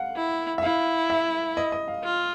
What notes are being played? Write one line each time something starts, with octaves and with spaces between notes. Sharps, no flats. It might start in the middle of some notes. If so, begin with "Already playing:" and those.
Already playing: F5 F#5
E4
E5
E4 F5
E5
D#5
D#5
F5
F4